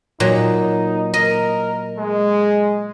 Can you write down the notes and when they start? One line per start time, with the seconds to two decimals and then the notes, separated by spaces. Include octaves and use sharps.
0.20 A#2 F#3 D#4
1.14 A#4 D#5
1.98 G#3